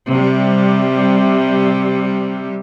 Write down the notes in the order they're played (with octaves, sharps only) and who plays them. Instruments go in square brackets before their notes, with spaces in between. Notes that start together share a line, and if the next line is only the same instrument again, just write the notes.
[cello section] C3 G3